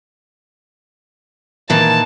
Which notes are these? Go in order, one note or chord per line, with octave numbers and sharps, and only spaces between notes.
A#2 D#3 E3 A5